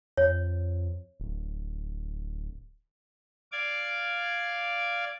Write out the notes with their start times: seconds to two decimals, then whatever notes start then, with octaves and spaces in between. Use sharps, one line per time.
0.17 F2 C#5
1.20 D1
3.52 D5 F5 D6 G#6